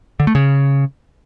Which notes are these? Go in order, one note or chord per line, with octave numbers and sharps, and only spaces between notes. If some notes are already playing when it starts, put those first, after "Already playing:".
D3
A3
C#3